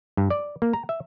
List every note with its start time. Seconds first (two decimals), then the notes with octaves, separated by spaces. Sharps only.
0.17 G2
0.30 D5
0.62 A#3
0.73 A#5
0.89 E5